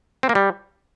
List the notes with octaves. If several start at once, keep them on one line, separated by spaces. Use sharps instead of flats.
C4
A#3
G3